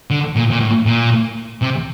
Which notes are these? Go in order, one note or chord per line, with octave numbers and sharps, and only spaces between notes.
D3
A#2
A#2
A2
A#2
C3